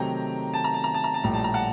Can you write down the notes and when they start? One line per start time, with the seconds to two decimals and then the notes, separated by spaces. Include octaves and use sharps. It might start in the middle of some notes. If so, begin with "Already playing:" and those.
Already playing: C3 D#3 F#3 A3 G5 A#5
0.54 A5
0.64 A#5
0.74 A5
0.84 A#5
0.94 A5
1.04 A#5
1.14 A5
1.23 A#1 A2 G3 A#5
1.34 A5
1.44 A#5
1.54 F#5 A5